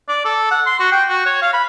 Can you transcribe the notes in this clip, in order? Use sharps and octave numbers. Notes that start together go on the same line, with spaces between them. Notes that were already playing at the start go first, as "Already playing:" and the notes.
D5
A4
F#5
C6
F#4
G5
F#4
C#5
F5
B5